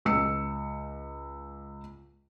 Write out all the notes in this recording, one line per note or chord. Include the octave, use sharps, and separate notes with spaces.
C#2 E6 C#7